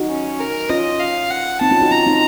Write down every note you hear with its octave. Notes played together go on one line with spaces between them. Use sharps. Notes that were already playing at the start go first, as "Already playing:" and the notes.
Already playing: D#4 F#4
C#4
A#4
C#4 F4 D#5
F5
F#5
C4 D#4 A5
C#4 F4
D#4 F#4
C#4 F4 A#5
C4 D#4